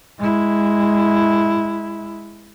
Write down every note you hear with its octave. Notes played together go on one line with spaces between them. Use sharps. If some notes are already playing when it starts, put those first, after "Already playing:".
G#3 E4